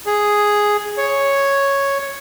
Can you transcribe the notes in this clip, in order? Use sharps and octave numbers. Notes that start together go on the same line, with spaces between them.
G#4
C#5